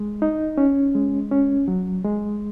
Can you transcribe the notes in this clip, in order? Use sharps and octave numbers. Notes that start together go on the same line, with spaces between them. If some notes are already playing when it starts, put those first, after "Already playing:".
Already playing: G#3
D#4
C#4
G#3
C#4
F#3
G#3